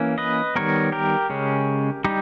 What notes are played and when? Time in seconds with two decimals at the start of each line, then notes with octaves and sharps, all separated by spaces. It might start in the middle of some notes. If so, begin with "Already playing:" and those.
Already playing: E3 A#3 C#4
0.18 B4 D#5
0.55 D#3 G3 B3 A#4 C#5
0.92 G4 A#4
1.30 C#3 G#3 C#4
2.04 G3 D#4 G4